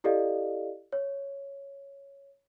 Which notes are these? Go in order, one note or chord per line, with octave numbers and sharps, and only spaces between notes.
E4 G4 A4 D5 D#5 F5
C#5